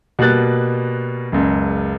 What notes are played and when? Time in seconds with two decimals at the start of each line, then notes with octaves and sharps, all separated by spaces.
0.19 B2 G3 A#3 F#6 A6
1.32 F#1 C#2